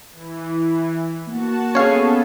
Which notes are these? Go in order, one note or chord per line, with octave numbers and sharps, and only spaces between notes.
E3
A#3 F#4 A5
B3 C#4 G#4 A4 C#5 F5